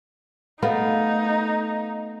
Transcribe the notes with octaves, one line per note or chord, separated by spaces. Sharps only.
A3 B3 D#4 A#4 B4 F5 F#5